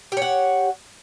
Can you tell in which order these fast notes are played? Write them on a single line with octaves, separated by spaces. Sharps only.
G4 C#5 F#5